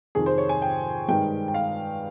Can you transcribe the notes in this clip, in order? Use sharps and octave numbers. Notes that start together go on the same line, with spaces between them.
F2 C3 D#3 G#4
C5
C#5
G#5
G5
G2 D#3 G#3 G5
G5
F5